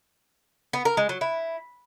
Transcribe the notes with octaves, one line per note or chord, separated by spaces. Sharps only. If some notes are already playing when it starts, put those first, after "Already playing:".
B3
A#4
G#3
F#3
E4